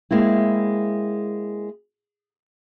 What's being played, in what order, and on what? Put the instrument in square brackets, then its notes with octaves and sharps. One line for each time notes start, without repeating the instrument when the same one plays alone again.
[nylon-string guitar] G#3 A#3 C4 E4